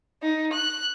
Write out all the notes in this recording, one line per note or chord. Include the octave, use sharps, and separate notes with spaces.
D#4
F#6